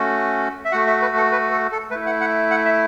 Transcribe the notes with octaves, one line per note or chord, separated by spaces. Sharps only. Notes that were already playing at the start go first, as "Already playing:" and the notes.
Already playing: A3 C#4 F#4
E5
A3 F#4 F#5
E5
B4
A4
B4
A4
A4
A3 E4 B4
F#5
F#5
F#5
E5